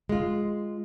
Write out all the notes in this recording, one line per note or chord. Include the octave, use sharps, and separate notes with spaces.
G#3 F4